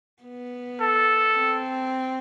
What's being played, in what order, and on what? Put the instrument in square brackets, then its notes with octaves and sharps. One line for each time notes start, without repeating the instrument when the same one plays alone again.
[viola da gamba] B3
[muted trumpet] A4
[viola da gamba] C4